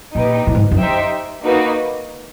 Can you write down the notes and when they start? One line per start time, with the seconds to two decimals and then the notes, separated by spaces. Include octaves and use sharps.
0.15 A#2 D#4 G4 B4
0.47 A2
0.55 G#2
0.71 F#2
0.79 D#4 G4 C5 E5 G5
1.43 A#3 D#4 F#4 B4